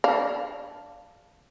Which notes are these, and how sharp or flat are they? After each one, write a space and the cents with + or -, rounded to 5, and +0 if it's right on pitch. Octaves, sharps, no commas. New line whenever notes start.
D4 +0 F5 +0